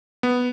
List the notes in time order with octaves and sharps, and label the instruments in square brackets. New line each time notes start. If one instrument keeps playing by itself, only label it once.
[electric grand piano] B3